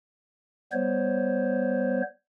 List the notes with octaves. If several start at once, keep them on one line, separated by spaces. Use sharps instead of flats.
G3 B3 C5 C#5